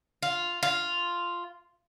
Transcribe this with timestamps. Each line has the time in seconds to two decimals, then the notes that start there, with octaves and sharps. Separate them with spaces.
0.23 F4
0.63 F4